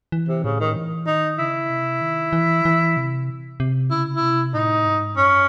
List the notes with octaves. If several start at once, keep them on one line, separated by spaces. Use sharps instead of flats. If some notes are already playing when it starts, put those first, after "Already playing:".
E3
C3
A2 C#3
D#3
E3
D#3 D#4
C#3 E4
C3
D#3
E3
E3
C3
C3
C#3 E4
E4
C3
A2 D#4
G#2
F#2 C#4